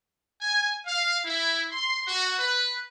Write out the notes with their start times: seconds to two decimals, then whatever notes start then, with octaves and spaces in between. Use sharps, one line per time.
0.41 G#5
0.85 F5
1.24 E4
1.71 C6
2.06 F#4
2.37 B4